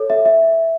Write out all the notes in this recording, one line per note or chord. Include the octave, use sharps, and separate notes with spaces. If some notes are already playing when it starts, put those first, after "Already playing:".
Already playing: A4 C#5
E5
E5